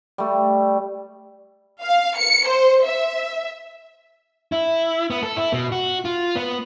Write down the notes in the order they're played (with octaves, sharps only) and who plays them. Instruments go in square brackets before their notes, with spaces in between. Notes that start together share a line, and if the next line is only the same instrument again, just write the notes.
[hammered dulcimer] G3 A3
[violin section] F5
C#7
C5
E5
[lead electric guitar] E4
B3
A4
E4
B2
F#4
F4
B3